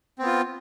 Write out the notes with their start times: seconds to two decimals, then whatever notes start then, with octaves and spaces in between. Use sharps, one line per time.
0.19 C4
0.22 B3
0.26 F4